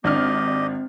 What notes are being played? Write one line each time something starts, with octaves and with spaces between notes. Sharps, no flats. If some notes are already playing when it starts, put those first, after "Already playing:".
G#1 C4 D4 G4 D#5 F6